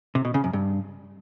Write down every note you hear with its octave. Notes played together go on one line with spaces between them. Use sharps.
C3
B2
C#3
F#2
G2